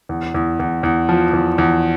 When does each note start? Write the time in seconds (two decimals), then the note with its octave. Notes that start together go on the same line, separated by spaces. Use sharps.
0.09 E2
0.34 E2
0.59 E2
0.83 E2
1.09 F3
1.33 E2
1.58 E2